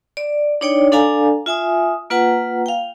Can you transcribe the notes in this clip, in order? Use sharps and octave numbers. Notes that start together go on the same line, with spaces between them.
D5
D4 D#4 C#5 D5 G5
D4 A4 D5 F5 G#5 A#5
F4 E5 G#5 D#6
A#3 F4 B4 F#5 A#5
F5 G5